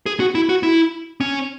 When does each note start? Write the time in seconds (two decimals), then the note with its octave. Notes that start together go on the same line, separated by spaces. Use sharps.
0.06 G#4
0.20 F#4
0.35 E4
0.49 F#4
0.63 E4
1.21 C#4